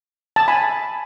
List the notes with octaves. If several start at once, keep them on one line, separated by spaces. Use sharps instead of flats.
A5
G#5 B5